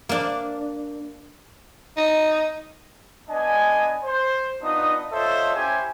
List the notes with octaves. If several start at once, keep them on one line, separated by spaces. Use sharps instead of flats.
A#3 D4
D#4
B3 D4 D#5 G#5
C5
B3 D4 D#4 F4 D#5 D#6
F4 A4 C5 C#5 D#5 E5
C#4 E4 G4 C5 G#5